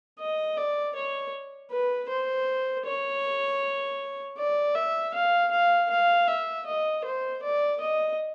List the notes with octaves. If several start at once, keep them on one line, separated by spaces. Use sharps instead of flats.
D#5
D5
C#5
B4
C5
C#5
D5
E5
F5
F5
F5
E5
D#5
C5
D5
D#5